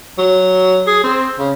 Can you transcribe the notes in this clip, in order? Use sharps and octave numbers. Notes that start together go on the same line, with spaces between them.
F#3
G#4
C4
C#3